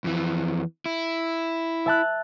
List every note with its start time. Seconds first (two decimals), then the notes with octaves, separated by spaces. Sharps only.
0.04 F2 E3
0.86 E4
1.86 E5 A5 F#6